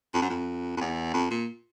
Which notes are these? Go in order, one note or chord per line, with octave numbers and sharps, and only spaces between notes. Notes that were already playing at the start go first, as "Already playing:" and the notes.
F2
F#2
F2
F2
E2
F2
A#2